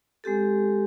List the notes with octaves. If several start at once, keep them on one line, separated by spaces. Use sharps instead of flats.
G#3 C4 G4 A4